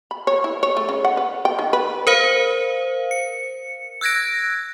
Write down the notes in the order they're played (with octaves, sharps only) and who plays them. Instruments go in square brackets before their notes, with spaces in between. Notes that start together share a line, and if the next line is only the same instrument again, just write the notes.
[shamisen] B5
C#5
E4
C#5
A3
C#3
F#5
B4
G5
D#3
B4
[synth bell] A#4 C5 F5
C#7
E6 F#6 G#6 A#6 D7